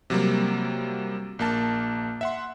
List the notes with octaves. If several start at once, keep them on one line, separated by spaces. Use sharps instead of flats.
C3 F#3 G3 A#3
A#1 A#3 A5
E5 F#5 C6